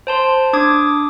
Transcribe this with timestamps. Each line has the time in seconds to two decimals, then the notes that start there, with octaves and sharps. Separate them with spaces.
0.07 C5 A5 C6
0.53 D4 D6 D#6 G#6